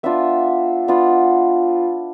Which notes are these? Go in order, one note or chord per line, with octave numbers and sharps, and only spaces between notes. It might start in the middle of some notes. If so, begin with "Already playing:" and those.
B3 D4 F4 E5
B3 D4 F4